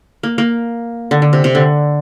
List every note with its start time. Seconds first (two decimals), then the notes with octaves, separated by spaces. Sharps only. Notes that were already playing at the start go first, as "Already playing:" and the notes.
0.23 A#3
0.38 A#3
1.11 D3
1.22 D3
1.33 C3
1.44 C3
1.55 D3